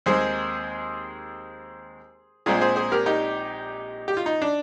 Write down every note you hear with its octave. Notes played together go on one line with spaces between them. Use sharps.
D#2 D#3 G#3 C4 G#4 C5
A#1 A#2 G#3 C4 F4 G#4
G#4 C5
G#4 C5
G4 A#4
D#4 G4
G4
F4
D#4
D4